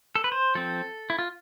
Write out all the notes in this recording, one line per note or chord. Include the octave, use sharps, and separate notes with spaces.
A4
B4
C5
F3 C4 A4
E4
F4